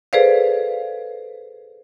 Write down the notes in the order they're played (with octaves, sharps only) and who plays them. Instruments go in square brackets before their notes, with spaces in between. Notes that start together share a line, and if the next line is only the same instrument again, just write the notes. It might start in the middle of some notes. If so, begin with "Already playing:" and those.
[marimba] G#4 A4 B4 C5 D5 F5